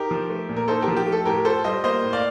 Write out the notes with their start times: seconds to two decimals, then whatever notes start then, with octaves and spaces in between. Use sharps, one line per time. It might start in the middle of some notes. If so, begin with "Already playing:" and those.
Already playing: D#4 G4 A#4
0.11 F3
0.30 A3
0.49 A#2
0.57 A#4
0.68 D#4 A4 C5
0.82 G4 A#4
0.88 F3
0.96 G4
1.07 A3
1.12 A4
1.25 A2 G4 A#4
1.45 F4 A4 C5
1.64 G3 C5 D#5
1.84 A#3 C5 D#5
2.03 A2
2.13 D5 F5